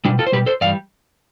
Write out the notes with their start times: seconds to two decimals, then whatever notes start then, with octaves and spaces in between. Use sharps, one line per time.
0.05 B2 G3 D4 F4
0.19 F4 A4
0.27 C5
0.32 B2 G3 G4 B4
0.46 A4 C5
0.61 G2 E3 G3 D5 F5